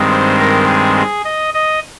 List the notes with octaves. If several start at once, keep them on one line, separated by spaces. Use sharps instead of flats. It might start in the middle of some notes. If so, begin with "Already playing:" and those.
Already playing: G2 D#3 G#3 C4
C5
A#4
G#4
G#4
D#5
D#5